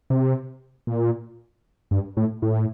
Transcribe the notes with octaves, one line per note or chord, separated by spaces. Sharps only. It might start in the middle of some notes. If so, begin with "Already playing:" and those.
C3
A#2
G2
A2
A2